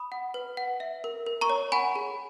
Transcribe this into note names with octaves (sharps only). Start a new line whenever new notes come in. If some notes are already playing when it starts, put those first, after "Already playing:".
Already playing: B5 D#6
F#5
B4
F#5
E5
A#4
A#4
A#5 C#6
C#5
F#5 G#5 B5
G#4